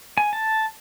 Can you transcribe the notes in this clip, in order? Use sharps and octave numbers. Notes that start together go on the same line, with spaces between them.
G#5
A5